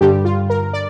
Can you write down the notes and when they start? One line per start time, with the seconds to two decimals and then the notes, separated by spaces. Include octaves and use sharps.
0.01 G2 D3 G3 G4
0.25 F4
0.50 A#4
0.73 D5